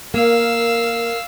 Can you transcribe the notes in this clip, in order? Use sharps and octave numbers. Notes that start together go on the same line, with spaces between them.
A#3 A#4 F5 E6